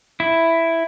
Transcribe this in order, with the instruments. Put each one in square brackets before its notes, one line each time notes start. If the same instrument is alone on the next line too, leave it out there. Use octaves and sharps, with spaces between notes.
[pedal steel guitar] E4